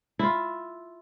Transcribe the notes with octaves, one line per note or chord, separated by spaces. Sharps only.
E4 F4